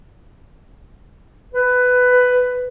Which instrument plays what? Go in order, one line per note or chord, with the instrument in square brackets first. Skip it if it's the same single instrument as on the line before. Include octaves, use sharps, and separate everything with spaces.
[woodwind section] B4